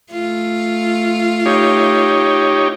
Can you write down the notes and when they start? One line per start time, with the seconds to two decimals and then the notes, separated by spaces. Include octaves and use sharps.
0.12 A3 F4
1.46 D#4 G4 C#5